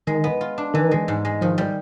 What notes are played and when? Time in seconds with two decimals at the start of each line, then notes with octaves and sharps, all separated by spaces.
0.07 D#3 G#3
0.24 B3
0.41 F4
0.58 D4
0.74 D#3 E3
0.91 G#3
1.08 G#2
1.25 G#3
1.41 D#3 F3
1.58 G3